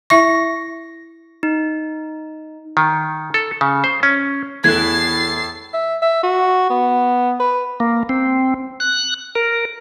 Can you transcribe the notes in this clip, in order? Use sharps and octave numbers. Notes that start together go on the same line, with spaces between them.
E4 E5 C#6 A#6
D#4
D#3
A4
C#3
C5
C#4
E2 A2 A3 E4 F#6 G#6 A6 C7
E5
E5
F#4
B3
B4
A#3
C4
F#6
A#4